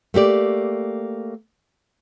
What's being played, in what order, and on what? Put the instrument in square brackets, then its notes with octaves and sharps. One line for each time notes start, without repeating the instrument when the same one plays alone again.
[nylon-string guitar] A3 A#3 G4 D5